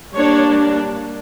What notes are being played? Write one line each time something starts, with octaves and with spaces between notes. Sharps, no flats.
G3 A#3 D4 C#5